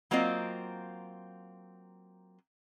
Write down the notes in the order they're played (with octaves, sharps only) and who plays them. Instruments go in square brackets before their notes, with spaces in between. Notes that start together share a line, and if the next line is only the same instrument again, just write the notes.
[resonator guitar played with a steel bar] F#3 A#3 C4 F4 D#5